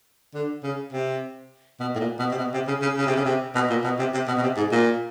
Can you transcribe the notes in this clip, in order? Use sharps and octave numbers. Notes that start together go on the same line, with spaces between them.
D3
C#3
C3
B2
A2
A#2
B2
C3
B2
C3
C#3
C#3
C#3
C3
C#3
C3
B2
A#2
B2
C3
C3
B2
B2
C3
G#2
A#2